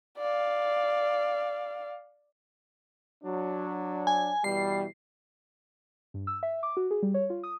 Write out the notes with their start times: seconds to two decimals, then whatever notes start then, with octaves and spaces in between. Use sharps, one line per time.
0.18 D5 F5
3.24 F#3 D4
4.07 G#5
4.44 B2 E3 G3 C7
6.14 G2
6.27 E6
6.43 E5
6.63 D6
6.77 F#4
6.91 G#4
7.03 G3
7.14 C#5
7.30 F4
7.43 D#6